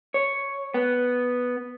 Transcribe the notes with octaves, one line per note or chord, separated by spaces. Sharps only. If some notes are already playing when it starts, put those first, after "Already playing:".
C#5
B3